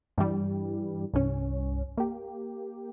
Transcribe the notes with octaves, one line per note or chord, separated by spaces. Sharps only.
G2 E3 G3
C2 G2 C#4
A#3 G4